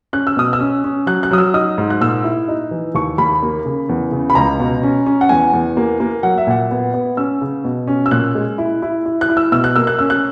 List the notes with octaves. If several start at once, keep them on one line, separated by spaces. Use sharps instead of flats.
C#4 F#6
E6
B2 D#6
E6
C#4
C#4
F#3 F#6
F#6
F#3 D#6
E6
D#4 D#6
G#2
F#6
A#2 E6
E4
D#4
E3
D#2 C#6
D#2 B5
A#3
C#3
E2
C#3
B5
C#2 A#5
B2
C#4
C#4
F#5
E2 G#5
E2
A#3
A#3
F#3 F#5
E5
A#2 F#5
B3
B3
C#4 E6
C#3
B2
C#4
E6
A#2 F#6
G#3
E4
E4
E4
F#6
E4
E6
B2 E6
F#6
A#3 E6
F#6
C#4 E6
F#6